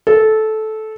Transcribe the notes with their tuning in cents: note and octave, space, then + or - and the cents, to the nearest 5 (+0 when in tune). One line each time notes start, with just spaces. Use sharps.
A4 -15